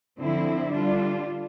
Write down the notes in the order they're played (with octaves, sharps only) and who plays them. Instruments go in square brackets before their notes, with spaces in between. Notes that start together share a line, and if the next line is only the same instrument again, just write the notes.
[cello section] D3 F3 C4 E4
D3 G3 D4 F4